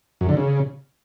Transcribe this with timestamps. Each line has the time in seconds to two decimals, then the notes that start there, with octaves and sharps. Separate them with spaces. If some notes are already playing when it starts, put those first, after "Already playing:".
0.21 F#2
0.29 D3
0.37 C#3